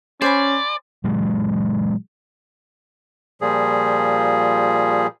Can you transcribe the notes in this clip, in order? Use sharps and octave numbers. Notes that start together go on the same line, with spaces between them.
C#4 C5 D5 G#5 B5
A#2 E3 F#3 G#3
A#2 F3 G3 G#4